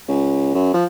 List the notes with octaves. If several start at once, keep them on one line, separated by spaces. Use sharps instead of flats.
C#2
F#2
F3